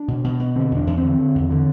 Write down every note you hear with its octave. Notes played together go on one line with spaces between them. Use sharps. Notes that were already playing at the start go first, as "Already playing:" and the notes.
Already playing: D4
B2
B2
B2
D3 C4
E2
D4
E2
C4
D3
D3
E2
D3